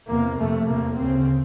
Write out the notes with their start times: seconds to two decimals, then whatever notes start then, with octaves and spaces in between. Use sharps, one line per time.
0.09 E2 C3 A#3
0.39 F2 C3 A3
0.68 E2 C3 A#3
0.97 D2 C#3 C4